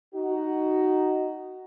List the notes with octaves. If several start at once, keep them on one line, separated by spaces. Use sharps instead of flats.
D#4 F#4